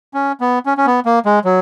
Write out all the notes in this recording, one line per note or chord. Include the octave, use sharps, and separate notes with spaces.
C#4
B3
C#4
C#4
B3
A#3
G#3
F#3